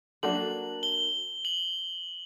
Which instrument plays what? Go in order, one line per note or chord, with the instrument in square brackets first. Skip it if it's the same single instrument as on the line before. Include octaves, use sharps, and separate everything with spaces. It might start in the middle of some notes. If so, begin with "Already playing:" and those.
[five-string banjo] F#3 A#3 D4 F#4 A4 [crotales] F#7
[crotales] G7
F#7